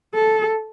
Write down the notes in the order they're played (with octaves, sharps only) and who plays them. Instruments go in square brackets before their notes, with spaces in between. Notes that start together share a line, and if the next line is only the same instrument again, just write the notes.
[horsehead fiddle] A4